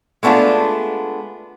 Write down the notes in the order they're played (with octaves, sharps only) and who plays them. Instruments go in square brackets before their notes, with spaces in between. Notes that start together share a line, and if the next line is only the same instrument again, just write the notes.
[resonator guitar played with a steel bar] G#3 A3 B3 D4 F4